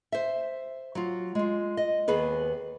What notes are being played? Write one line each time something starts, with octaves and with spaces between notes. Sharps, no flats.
C5 E5
F#3 F4
G#3 F4
D#5
D#2 B3 G#4 B4